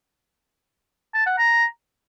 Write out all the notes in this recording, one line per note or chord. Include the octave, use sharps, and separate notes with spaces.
A5
F#5
A#5